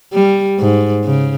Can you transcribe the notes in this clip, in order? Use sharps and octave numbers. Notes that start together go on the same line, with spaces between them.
G3
G#2
C#3